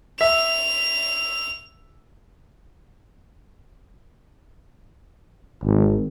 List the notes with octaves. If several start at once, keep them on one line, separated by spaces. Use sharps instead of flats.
E5 F7
G#1